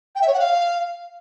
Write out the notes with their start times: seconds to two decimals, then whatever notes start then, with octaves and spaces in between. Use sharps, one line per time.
0.15 G5
0.21 E5
0.27 C#5
0.34 F#5
0.40 F5